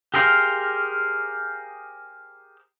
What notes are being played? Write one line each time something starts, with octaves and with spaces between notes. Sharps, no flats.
G4 G#4 A#4 C5 F5